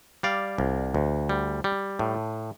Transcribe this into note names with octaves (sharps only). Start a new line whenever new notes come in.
G3 D5 F5
C2
D2
G3
G3
A2